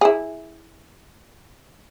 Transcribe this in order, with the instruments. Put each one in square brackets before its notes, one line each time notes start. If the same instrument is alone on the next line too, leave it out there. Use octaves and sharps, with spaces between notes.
[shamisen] E4 G#4